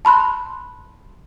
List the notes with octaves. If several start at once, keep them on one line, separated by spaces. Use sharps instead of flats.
A5 B5 C6 F#6